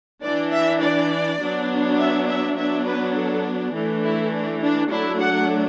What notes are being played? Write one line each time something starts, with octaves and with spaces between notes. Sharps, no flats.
E3 D4 D5
E5
D5
F#3 B3 D4
E5
E5
F#3 B3 D4 E5
B4
A4
E3 A3 D4
E4
D4
D4
F#3 A3 D4 E4
F#5